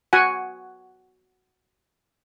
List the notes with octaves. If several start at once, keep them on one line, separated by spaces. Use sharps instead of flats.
F#4 F#5 G#5